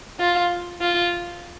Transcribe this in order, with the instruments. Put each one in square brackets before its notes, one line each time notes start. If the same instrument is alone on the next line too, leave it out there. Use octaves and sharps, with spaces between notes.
[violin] F4
F4